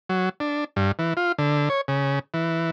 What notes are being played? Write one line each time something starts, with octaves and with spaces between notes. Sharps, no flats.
F#3
D4
G2
E3
F4
D3
C#5
C#3
E3